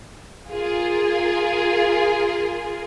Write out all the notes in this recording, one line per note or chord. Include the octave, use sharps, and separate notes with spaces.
F4 G#4 A#4